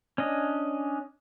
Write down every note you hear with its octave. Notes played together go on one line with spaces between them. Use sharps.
C#4 D4 D#5